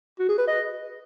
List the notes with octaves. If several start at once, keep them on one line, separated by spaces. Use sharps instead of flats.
F#4
G#4
B4
D#5